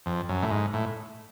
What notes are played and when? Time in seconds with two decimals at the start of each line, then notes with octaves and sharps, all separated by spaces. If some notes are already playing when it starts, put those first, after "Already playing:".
0.06 F2
0.29 F#2
0.42 A2
0.50 G#2
0.73 A2